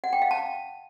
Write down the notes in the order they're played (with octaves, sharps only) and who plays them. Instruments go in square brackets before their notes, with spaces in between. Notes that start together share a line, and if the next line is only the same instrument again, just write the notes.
[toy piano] F#5
G5
F5
A5